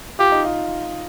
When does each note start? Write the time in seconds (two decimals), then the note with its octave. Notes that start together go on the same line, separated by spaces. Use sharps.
0.19 F4 G4
0.32 D#4
0.45 F4